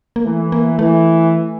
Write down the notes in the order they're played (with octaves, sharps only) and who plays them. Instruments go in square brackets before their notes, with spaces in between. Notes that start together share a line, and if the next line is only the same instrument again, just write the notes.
[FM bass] A#3
[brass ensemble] E3 [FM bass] A3
[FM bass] A#3
[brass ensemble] E3 [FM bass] A3